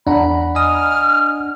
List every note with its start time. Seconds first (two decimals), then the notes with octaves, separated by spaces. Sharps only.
0.07 E2 D4 F#5 A#5 B5
0.55 D#5 G#5 D#6 F6